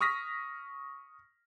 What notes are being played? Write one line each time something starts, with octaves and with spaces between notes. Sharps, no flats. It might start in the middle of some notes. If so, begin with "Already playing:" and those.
C#6 D#6 F6 A#6 B6